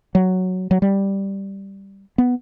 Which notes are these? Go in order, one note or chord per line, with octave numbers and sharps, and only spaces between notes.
F#3
F#3
G3
B3